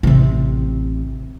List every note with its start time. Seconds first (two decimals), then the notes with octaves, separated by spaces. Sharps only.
0.03 A1 C3